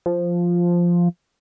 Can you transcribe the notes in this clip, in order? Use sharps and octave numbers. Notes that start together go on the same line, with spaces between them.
F3